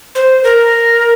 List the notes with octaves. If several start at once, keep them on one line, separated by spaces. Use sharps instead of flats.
C5
A#4